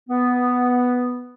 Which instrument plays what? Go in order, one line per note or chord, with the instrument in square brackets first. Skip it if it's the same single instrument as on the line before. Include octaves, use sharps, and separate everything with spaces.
[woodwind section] B3